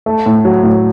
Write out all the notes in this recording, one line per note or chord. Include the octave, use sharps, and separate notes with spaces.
A3
A2
F#3
A2